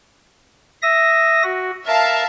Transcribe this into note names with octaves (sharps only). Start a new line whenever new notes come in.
E5 D#6 A#6
F#4
A#4 E5 F5 A5